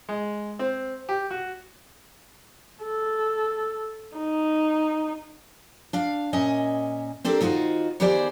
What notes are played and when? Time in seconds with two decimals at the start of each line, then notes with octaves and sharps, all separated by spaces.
0.09 G#3
0.59 C4
1.09 G4
1.31 F#4
2.83 A4
4.17 D#4
5.93 D4 F5
6.33 A#2 C#4 D#5 E5
7.25 C4 D4 G4 A4 A#4
7.41 D#3 D#4 F4 F#4 C5
8.00 D#3 B3 G4 G#4 C5 D5